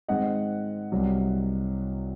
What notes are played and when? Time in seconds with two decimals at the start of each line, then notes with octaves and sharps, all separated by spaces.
0.08 G#2 D#3 G#3 C4 D#5 F#5
0.92 C2 C3 F#3